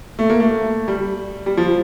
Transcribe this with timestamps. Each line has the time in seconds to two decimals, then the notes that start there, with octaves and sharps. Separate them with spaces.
0.19 A3
0.30 A#3
0.40 A3
0.88 G3
1.46 G3
1.57 F3